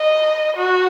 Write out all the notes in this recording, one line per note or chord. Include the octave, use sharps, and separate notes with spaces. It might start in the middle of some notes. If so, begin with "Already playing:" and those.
Already playing: D#5
F#4